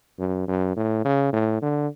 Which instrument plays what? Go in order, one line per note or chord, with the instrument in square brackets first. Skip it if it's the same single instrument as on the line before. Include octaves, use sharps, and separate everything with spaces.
[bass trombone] F#2
F#2
A2
C#3
A2
D3